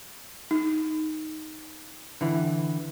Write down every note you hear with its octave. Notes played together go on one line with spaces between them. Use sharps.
D#4
D3 E3